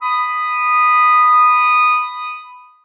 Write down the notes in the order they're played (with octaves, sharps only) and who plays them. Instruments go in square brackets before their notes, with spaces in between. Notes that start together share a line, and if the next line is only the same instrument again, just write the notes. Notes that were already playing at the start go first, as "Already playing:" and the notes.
[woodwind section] B5 D#6